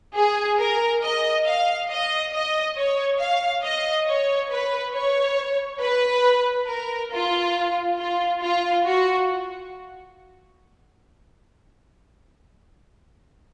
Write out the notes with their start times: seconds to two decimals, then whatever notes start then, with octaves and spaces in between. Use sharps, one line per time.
0.15 G#4
0.58 A#4
1.02 D#5
1.45 F5
1.89 D#5
2.33 D#5
2.76 C#5
3.19 F5
3.63 D#5
4.07 C#5
4.50 B4
4.94 C#5
5.81 B4
6.67 A#4
7.12 F4
7.98 F4
8.41 F4
8.85 F#4